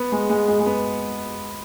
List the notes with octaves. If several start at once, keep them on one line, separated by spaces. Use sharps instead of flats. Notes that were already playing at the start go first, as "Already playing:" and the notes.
Already playing: B3
G#3
G#3
G#3
G#3
B3